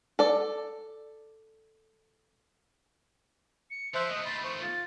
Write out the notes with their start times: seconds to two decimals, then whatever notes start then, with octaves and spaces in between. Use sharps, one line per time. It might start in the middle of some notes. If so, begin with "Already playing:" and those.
0.19 A4 D5
3.71 C#7
3.95 F3 C5 E5 F#6
4.10 D#3 A3 D#5
4.25 B5 C6 A6
4.44 C5 C#6
4.61 F4 A6